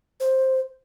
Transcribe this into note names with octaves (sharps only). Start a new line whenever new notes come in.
C5